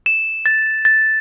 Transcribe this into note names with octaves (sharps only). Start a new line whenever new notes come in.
E7
A6
A6